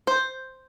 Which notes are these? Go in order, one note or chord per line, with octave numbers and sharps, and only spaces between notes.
C5